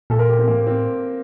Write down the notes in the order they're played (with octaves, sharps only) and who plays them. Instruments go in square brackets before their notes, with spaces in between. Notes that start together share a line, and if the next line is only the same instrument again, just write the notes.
[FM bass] A#2 [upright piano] A4
[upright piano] A#4
G4
C4
[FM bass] A2 [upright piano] A#3
[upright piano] C4